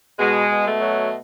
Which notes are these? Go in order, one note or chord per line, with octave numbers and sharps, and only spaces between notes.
B2 G#3
B2
A3
F#3